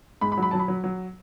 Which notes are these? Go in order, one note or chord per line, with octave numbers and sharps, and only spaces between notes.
G#2 B5
B5
F#3
B5
F#3 A5
B5
F#3
F#3